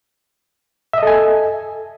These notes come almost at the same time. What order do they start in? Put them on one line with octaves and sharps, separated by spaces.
E5 D#5 A4 G#5